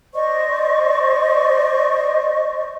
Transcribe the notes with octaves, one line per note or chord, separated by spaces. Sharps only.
C5 D5 D#5 C#6